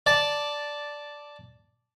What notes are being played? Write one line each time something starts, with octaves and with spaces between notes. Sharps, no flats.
D5 A5